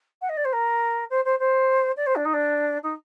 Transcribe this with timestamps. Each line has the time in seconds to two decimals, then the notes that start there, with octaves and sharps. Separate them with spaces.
0.22 F#5
0.29 D#5
0.37 D5
0.45 C5
0.53 A#4
1.10 C5
1.25 C5
1.40 C5
1.97 D5
2.07 C5
2.16 D4
2.25 D#4
2.34 D4
2.83 D#4